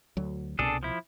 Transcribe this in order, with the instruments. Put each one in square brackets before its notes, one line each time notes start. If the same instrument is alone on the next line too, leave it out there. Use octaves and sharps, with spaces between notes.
[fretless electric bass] D2 F#3
[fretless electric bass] C2 B2 [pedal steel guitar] D4 G#4 A4
[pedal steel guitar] F3 E4